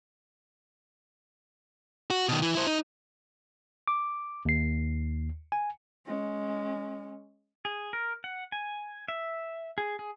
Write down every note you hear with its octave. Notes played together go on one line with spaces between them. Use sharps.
F#4
B2 D#3
E3
E4 C5
D#4
D6
D#2 C7
G#5
G#3 C#4
G#4
A#4
F#5
G#5
E5
G#4
G#4